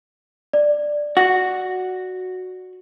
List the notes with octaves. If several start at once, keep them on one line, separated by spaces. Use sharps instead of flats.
D5
F#4